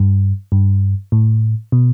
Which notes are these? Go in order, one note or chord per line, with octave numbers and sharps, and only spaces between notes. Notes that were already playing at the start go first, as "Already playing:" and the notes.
Already playing: G2
G2
A2
B2